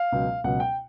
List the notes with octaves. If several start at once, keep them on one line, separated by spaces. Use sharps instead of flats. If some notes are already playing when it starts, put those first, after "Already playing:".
Already playing: F5
C#2 B2 F#3
C#2 B2 F#3 F#5
G5